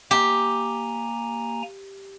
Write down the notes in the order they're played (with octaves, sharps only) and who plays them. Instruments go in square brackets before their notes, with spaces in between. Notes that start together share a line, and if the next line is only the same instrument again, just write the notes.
[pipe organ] A#3 G#5 A#5 [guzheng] G4